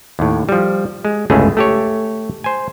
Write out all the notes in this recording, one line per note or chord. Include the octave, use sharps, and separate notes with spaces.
D#2 A2
F3 G3
G#3
G1 C#2 A2 A3 C#4 G#4
A3 G4 C#5
C5 G#5